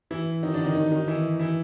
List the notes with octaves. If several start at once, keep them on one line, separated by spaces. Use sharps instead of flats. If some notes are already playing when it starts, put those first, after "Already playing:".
E3 E4
D#3 D#4
D3 D4
D#3 D#4
D#3 D#4
D#3 D#4
E3 E4
E3 E4